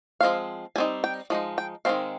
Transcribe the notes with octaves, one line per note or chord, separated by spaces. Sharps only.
F3 G#3 C4 F5
G3 C4 D#4 G#5
G5
F3 G#3 D#4
G5
D#3 G#3 C4 F5